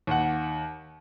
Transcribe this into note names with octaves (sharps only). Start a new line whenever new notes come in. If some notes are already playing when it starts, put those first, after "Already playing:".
D#2 F#5